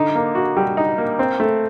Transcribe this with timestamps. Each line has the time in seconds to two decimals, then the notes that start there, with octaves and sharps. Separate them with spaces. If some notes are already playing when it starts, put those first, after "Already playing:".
Already playing: D3 D#4
0.15 A#3
0.35 F#4
0.57 G3
0.77 D#4
0.98 A#3
1.19 C4
1.40 A3